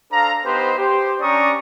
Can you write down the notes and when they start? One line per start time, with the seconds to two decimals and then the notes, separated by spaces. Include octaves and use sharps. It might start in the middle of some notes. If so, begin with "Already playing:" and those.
0.11 D4 A4 C5 F5 A#5
0.44 B3 D#4 G4 B4 C5
0.78 G4 C5
1.20 C#4 D4 D5 A#5 C#6 D#6